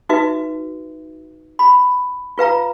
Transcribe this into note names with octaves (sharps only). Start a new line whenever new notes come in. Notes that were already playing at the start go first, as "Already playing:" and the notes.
D#4 F#4 B4 E5
B5
F4 B4 F5 A#5